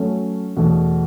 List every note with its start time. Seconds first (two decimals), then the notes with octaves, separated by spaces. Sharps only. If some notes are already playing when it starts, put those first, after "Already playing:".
Already playing: F#3 A3 C#4
0.57 E2 B2 A3